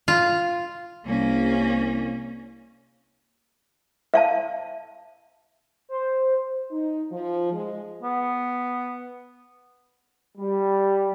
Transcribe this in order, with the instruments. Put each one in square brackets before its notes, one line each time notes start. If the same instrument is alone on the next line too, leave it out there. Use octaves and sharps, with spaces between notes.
[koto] F4
[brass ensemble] C2 [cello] A#3 C#4
[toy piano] E5 F5 A5
[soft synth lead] C5
[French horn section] D#4
F3
G#3
[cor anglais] B3
[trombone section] G3